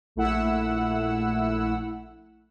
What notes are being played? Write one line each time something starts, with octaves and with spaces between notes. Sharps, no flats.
A#1 A3 E4 F#5 E6